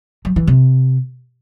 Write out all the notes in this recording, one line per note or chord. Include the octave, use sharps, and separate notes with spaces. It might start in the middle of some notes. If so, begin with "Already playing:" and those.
F#3
E3
C3